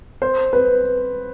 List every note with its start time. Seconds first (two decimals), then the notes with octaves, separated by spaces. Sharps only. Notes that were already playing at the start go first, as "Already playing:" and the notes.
0.22 C5
0.53 B4